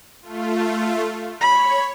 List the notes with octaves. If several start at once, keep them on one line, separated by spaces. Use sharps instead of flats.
A3 F4
C#5 B5